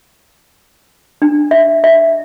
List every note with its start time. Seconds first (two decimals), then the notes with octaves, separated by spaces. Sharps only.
1.22 D4
1.51 E5
1.84 E5